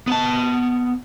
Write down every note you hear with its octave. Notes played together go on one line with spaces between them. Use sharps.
B3 A5